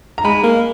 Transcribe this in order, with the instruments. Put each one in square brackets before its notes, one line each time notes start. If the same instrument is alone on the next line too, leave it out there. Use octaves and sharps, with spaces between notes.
[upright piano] A#5
[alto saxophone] G#3 [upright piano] B5
[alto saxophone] A#3